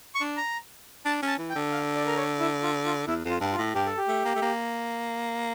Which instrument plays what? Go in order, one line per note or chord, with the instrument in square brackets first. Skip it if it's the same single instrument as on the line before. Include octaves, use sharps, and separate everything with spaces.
[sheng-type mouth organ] C#6
[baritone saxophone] D4
[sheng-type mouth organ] A#5
[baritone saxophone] D4 [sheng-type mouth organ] A5
[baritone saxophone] C#4
[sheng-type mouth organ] A5
[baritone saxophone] E3
[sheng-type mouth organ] G5
[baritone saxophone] D3
[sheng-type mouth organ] F5
D5
A#4
C#5
E4
F4
F4
[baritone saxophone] E2 [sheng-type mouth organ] E4
[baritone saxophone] F2 [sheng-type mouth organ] F4
[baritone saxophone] G2
[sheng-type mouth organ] F4
[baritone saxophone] A2
[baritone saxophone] G2 [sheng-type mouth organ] G4
[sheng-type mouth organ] A4
G4
[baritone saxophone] A3
A#3
A3
A#3